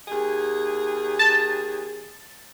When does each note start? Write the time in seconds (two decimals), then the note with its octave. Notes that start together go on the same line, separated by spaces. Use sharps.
0.08 D#2 G#4
1.19 A5